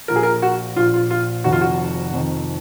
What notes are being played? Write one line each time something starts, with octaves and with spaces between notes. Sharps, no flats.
A#1 A#2 A#4
G#4
A#4
F#4
A#1 A#2 F4
F4
F4
F1 F2 D#3 F#4
F4
F#4
F1 F2 D#3